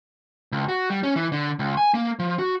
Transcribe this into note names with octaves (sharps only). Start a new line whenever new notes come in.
C#2
F#4
G3
C#4
E3
D3
C#2
G#5
A#3
F3
F#4